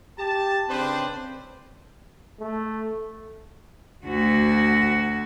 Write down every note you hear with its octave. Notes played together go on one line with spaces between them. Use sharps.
G4 A5
C#3 C4 D4 B4 C5
A3
D2 F#4